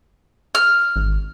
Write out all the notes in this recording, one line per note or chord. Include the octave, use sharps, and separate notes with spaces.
F6
G#1